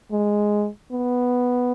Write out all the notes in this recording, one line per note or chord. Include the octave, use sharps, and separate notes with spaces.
G#3
B3